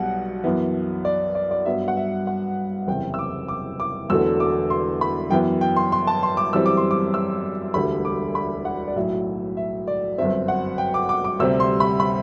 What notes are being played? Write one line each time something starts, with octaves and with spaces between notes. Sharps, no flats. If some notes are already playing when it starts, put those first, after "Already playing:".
Already playing: B1 B2 G3 F#5
F#2 E3 B3
D5
D5
D5
G2 F#3 B3 E5
F#5
E5
F#5
F#1 E2 C3 G5
E6
D6
D6
D6
E1 E2 D3 F#3 A3 E6
D6
C6
B5
F#2 E3 B3 G5
G5
C6
C6
A5
C6
D6
F#2 E3 G3 C4 E6
D6
C6
D6
E6
E1 D2 D3 G3 B5
D6
B5
F#5
D5
B1 A2 F#3 E5
E5
D5
G1 F#2 F#3 C4 E5
F#5
G5
D6
D6
D6
D2 C3 G3 C4 E6
C6
B5
B5